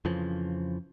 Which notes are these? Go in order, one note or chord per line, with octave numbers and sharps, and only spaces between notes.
F2 C#3 E3 F3